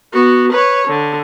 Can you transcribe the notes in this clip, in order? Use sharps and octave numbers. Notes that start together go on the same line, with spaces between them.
B3 F#4
B4 C#5
D3